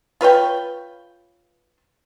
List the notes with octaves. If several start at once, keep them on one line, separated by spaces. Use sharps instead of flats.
F4 B4 C#5 G5